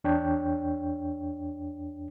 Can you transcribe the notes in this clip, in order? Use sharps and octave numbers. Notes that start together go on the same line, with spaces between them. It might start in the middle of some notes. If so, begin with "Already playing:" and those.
E2 D4 C#5 G5